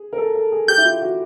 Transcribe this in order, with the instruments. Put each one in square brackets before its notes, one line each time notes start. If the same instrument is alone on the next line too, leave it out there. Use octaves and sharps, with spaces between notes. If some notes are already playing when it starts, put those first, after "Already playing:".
Already playing: [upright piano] G#4
A#4
A4
A4
G#4
[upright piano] G4 [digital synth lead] G6
[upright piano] E4
F4
F#4